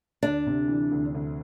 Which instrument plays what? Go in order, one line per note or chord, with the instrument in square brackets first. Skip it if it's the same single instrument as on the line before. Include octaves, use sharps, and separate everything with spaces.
[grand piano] D2 [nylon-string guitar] D4
[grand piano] C3
E3
D2
D2